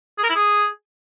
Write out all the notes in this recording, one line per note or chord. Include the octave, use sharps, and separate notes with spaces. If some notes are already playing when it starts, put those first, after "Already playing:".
G#4
A#4
E4
G#4